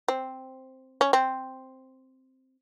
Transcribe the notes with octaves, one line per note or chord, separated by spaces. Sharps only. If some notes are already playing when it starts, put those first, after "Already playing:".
C4
C#4
C4